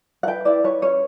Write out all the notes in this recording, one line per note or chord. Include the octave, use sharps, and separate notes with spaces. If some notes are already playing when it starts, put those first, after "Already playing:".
F#5
B4 G5
E4 D5
B4 C#5
C#4 C#5